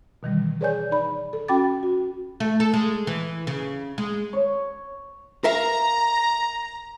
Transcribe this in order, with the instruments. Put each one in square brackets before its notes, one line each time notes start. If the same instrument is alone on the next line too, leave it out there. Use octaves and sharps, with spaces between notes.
[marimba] B2 D#3 E3 G3
G#4 B4 C#5 D5 G#5 G6
D#4 D5 B5
A4
C#4 F#4 G5 B5 D6 A6
F#4
[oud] A3
A4
G#3
E3
C#3
G#3
[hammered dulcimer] C#5
[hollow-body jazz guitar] A#4 E5 F5 [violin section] A#5